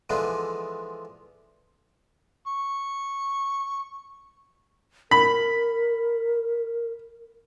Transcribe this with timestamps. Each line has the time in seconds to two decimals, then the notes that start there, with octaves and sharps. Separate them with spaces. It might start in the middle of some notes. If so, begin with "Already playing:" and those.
0.10 D3 E3 F3 G#3 B3 D4
2.47 C#6
5.11 A#4 B5